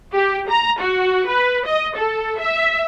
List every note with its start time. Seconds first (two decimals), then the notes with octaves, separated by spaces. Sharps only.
0.13 G4
0.49 A#5
0.79 F#4
1.27 B4
1.65 D#5
1.97 A4
2.38 E5